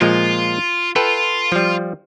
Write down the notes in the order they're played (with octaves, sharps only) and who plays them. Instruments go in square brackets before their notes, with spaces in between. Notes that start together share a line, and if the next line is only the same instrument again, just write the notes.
[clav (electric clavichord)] A#2 F3 G#3 [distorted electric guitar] F4
[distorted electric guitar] F4 [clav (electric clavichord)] A4 B4 G5
[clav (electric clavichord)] F3 G3